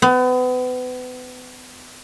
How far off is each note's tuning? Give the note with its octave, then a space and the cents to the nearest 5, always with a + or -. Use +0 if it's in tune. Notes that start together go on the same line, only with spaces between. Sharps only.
B3 +35